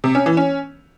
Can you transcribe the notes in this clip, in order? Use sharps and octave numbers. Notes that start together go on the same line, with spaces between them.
C3
C#4
E3
C#4